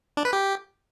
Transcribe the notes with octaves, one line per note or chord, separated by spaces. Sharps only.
D4
B4
G4